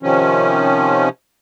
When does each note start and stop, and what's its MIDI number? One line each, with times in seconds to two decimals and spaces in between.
0.03 1.09 48
0.03 1.09 51
0.03 1.09 53
0.03 1.09 61